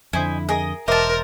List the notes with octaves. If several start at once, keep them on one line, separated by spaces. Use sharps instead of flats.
F2 D3 E4 C5 D#5 G#5
G#4 A#4 D#5 D#6
E1 A#4 C5 D#5 E5 A5 D6